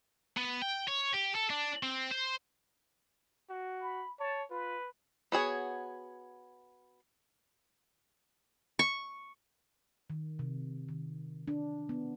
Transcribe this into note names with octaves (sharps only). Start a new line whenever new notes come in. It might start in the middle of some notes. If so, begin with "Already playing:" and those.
B3
G5
C#5
G4
A4
D4
C4
C5
F#4
B5
C#5 A5
F4 B4
B3 F#4 G#4 C#5
C#6
D#3
C3
D#3
D4
B3